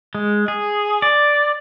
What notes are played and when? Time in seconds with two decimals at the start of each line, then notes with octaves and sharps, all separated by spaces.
0.15 G#3
0.48 G#4
1.02 D5